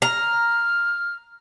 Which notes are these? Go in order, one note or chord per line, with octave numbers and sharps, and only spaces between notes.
A#5 F6